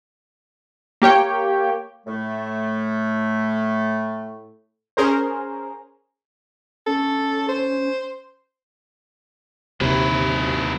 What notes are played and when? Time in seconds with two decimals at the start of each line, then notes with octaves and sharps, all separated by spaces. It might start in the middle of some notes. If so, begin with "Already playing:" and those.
1.02 A#3 G4 C#5 G5
2.07 A2 A3
4.97 C#4 G#4 A#4 C5
6.87 C#4 A4
7.49 C5
9.81 D#2 C3 F#3 E4